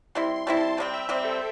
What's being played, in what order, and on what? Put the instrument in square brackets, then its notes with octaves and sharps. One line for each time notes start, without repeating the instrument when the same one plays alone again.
[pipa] G3 C4 E4 [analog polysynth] C6
[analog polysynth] C6
[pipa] G3 C4 E4 [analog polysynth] A5
[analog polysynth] C6
[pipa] C3 G3 C4 [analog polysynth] G5
[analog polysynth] E5
[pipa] C3 G3 C4 [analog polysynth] C5
[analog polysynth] A4